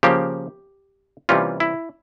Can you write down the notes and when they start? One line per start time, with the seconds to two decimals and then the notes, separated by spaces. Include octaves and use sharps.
0.03 C#3 F3 A#3 G4
1.29 C3 E3 G3 A#3 C#4 F4
1.60 E4